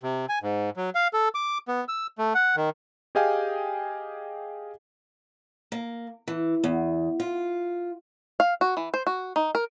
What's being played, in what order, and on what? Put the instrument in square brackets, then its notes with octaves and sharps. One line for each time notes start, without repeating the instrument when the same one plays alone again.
[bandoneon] C3
G#5
G#2
F#3
F5
A4
D6
B3
E6
A3
F#5
D#3
[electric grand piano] G4 G#4 D#5 F5 G5 G#5
[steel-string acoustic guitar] A#3
E3
E2
F4
[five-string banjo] F5
F#4
E3
C5
F#4
D#4
A#4